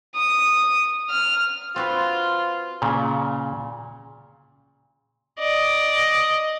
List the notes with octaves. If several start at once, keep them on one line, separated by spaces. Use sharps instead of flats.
D#6
F6
C4 F4 F#4 B4
A#2 C#3
D5 D#5